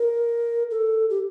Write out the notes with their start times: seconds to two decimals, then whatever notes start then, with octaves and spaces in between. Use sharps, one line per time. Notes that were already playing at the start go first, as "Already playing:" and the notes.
Already playing: A#4
0.71 A4
1.10 G4